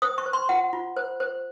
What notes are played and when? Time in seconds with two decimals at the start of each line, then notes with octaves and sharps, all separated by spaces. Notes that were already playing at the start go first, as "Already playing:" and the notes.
0.02 C5 D#6
0.18 C#6
0.26 C5
0.33 C6
0.49 F4 F#5
0.73 F4
0.96 C5
1.20 C5